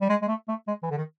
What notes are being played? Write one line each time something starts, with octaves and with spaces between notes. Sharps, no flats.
G3
G#3
G#3
A3
A3
G#3
E3
D3
D#3